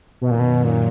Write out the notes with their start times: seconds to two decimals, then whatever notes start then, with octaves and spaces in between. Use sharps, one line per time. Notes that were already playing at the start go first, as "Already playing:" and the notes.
0.21 F#2 B2 D#3 F#3
0.31 A#2
0.39 B2
0.64 A#2